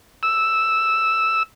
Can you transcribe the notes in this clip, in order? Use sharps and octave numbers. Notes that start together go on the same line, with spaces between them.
E6